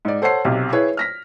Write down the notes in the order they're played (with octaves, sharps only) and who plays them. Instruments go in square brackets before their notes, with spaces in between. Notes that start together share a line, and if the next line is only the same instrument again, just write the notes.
[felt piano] G#2 D5
A4 C5 C#5 F#5 C7
B1 C3
E4 G#4 B4 C#5
F6 A#6 B6